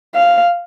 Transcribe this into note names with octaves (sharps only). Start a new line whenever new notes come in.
F5